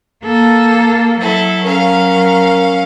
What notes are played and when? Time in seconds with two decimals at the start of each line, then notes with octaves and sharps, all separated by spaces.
0.24 A#3 A4
1.20 F#3 E4 A4
1.64 C#4 A#4 F5